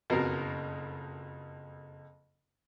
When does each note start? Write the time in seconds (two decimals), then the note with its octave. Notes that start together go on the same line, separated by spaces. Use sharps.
0.10 F#1 F2 B2 A#4